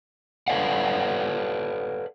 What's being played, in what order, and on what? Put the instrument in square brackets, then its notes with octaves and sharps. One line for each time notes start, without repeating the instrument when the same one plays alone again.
[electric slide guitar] A4 B4 D5 F5 F#5